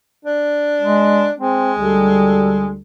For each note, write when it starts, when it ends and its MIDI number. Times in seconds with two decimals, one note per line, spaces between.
0.25 1.31 62
0.81 1.27 56
1.38 2.71 56
1.38 1.72 60
1.78 2.78 38
1.78 2.78 55
1.78 2.78 69